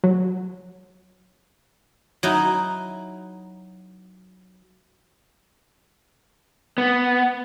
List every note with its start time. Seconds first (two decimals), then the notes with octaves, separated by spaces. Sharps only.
0.04 F#3
2.23 F#3 D#4 E4
6.78 B3